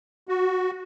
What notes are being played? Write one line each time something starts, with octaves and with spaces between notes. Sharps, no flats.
F#4